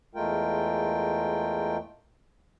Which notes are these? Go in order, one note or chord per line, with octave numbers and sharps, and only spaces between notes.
E2 G#3 A3 F4 A#4 G5